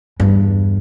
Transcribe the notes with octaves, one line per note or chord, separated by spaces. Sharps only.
E2 G2